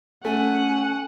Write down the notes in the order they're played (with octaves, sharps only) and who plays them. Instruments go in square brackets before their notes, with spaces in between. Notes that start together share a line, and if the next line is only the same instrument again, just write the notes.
[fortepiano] A3 [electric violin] C#4 F#5 [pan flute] G#5